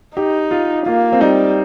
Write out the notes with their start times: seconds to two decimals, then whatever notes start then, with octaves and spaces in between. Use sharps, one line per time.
0.17 D#4 G4
0.51 F4
0.86 A#3 F4
1.13 C4
1.21 G3 D#4